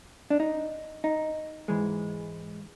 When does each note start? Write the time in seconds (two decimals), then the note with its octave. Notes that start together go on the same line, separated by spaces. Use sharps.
0.30 D4
0.40 D#4
1.04 D#4
1.68 G#2 E3 G#3